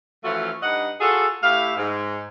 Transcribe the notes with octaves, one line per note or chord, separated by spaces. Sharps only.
E3 F3 A3 C#4 F4 F#4
G2 D#4 D#5 F#5
F4 F#4 G#4 A4
A2 E4 G4 E5 F5
G#2